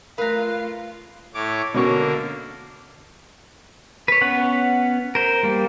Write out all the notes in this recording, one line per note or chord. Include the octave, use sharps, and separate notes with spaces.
A3 F4 A#4 B4 F5 A#5 F#6
A2 C#5 D6
B2 D3 A#3 C#4 C#6
B4 C#5
B3 C#4 F#5
A#4 C5
G3 A#3